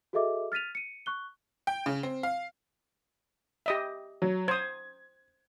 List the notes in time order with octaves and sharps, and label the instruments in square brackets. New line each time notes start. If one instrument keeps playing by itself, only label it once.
[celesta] F#4 G#4 A4 D#5 E5 D6
F6 A6 B6 D#7 F7
C#7 D#7
C#6 F#6 G7
[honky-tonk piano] G5
C#3
C4
F5
[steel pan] G4 D#5 E5
[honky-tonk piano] F#3
[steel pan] C5 D#6 [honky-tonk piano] G#6